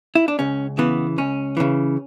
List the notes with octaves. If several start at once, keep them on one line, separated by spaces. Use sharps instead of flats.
E4
D4
C#2 C#4
C#3 E3 B3
C#2 C#4
C#3 E3